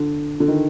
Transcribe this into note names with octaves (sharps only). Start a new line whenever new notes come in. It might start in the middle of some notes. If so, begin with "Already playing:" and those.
Already playing: D3
D3
D#3